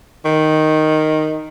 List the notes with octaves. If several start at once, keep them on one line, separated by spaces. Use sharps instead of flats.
D#3